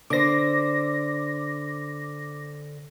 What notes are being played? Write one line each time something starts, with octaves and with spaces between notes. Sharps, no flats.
D3 C5 D6 A#6